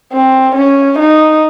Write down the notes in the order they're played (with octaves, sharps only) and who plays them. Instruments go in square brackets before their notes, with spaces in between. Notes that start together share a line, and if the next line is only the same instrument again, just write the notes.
[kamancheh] C4
C#4
D#4